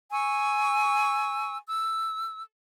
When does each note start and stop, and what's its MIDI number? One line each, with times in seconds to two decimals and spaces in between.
0.11 1.57 80
0.11 1.57 85
0.11 1.57 88
1.66 2.42 88